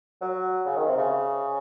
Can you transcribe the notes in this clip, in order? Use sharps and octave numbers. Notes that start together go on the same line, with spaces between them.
F#3
C#3
D#3
C3
C#3